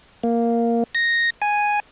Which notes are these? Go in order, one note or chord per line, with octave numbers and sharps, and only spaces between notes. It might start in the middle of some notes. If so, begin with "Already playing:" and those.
A#3
A#6
G#5